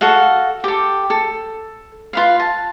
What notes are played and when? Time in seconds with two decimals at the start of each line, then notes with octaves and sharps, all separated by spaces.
0.01 F#4 A4 F5 F#5
0.64 G4 A4
1.10 A4
2.13 F4 B4 F5
2.39 A5